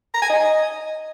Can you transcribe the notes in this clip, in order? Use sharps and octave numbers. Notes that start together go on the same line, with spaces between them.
A#5
G#5
D#5